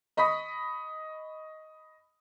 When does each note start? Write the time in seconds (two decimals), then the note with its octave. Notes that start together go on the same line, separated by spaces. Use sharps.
0.17 D#5 B5 C#6 D#6 B6